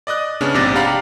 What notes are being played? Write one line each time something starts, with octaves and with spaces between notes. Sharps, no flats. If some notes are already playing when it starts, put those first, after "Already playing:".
D5 D#5 D#6 F#6
C#3 B3 C#4 D4
A#1 G#2 C3 D5 A6 A#6
D4 G4 F5 F#5 A#5 B5